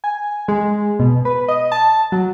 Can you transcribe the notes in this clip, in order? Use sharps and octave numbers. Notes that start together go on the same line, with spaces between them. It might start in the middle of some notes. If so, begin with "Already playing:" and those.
G#5
G#3
B2
B4
D#5
A5
F#3